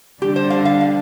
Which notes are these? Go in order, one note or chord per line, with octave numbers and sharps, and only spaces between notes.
D3 G3 D4 G4
C5
F5
F5
F5